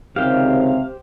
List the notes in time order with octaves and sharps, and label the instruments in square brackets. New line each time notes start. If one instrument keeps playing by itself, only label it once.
[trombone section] C#2 D#3 C4 [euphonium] C3 [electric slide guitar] G4 C5 G5 [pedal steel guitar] F5